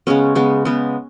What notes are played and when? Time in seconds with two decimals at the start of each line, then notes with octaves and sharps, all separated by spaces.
0.07 C#3 G#3 B3 C#4
0.35 C#3 G#3 B3
0.65 C#3 G#3 B3